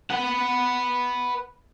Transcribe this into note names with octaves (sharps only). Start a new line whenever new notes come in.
B4 F#5